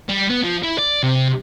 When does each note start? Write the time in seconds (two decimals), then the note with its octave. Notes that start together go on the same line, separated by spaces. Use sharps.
0.09 G3
0.29 B3
0.44 F3
0.63 E4
0.78 D5
1.03 C3